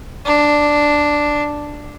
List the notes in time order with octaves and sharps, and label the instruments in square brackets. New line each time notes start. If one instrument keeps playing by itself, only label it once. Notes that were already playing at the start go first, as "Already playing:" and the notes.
[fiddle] D4